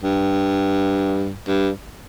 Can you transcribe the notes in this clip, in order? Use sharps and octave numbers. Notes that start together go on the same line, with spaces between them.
G2
G2